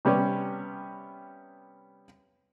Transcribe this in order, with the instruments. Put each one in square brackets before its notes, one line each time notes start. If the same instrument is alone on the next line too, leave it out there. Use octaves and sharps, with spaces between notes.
[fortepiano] C3 G3 B3 C#4